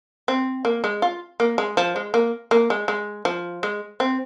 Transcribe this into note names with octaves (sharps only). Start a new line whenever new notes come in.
C4
A#3
G#3
F4
A#3
G#3
F3
G#3
A#3
A#3
G#3
G#3
F3
G#3
C4